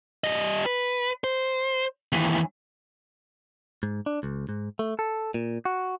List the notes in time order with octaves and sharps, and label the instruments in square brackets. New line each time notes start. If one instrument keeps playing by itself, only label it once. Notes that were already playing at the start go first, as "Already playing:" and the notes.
[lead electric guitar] G3 D#5
B4
C5
D#2 E3
[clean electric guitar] G#2
D4
C#2
G#2
A3
A4
A#2
F#4